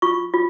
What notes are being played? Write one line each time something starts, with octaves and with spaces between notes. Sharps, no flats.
F4 C#6
F4